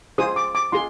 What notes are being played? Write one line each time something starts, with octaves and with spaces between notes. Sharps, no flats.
F4 G#4 C5 D#6
D6
D6
F4 G#4 C6